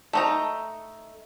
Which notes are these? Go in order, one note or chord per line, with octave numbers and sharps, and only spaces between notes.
A3 D#4 A#5